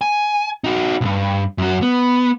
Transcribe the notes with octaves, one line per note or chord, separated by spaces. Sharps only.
G#5
D#4 F#4
B1 G2
F#2 F#4
B3